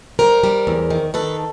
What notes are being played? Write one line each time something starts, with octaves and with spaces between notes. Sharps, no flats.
G3 A#4 C5
G3
E2
D#3
D#3 A4 B4